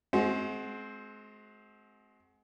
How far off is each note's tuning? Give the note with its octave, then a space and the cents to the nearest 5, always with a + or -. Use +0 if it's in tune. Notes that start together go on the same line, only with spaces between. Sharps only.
G#3 +35 C4 +0 F#4 +0